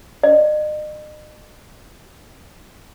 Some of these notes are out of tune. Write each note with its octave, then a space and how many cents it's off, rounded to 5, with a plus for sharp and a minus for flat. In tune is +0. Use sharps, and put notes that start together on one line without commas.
D#5 -40